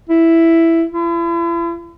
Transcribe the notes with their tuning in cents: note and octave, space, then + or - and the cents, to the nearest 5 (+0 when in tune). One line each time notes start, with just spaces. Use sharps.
E4 +5
E4 +40